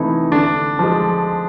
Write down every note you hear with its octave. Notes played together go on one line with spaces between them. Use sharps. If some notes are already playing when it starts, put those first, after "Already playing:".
Already playing: C3 E3 A3 D#4
D3 D4
F3 G#3